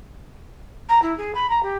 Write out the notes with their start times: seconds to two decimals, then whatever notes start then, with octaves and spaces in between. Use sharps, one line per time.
0.89 A#5
1.02 E4
1.17 G#4
1.34 B5
1.49 A#5
1.63 G4